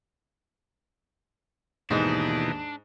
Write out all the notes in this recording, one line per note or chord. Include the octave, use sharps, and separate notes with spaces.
D#2 G#2 B2 E3 D4 D#4